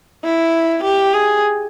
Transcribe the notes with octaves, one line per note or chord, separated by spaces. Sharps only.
E4
G4
G#4